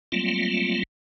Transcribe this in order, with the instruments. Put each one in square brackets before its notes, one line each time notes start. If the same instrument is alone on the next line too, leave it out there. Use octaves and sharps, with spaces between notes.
[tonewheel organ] F#3 G3 A3 A#3 C4 F4